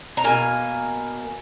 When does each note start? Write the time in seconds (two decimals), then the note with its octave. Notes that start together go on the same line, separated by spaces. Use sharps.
0.17 A#5
0.24 B2 A#3 G#5